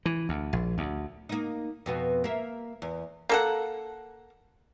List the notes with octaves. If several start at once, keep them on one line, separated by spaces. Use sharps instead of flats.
E3
D2
A#1
D2
A#3 D#4
F2 B2 B3
A#3 E5
E2
A#3 A4 F#5